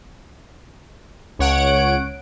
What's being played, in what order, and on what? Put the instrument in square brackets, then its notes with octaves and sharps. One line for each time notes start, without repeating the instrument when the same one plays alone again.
[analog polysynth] C#2 C#5 F#5 D7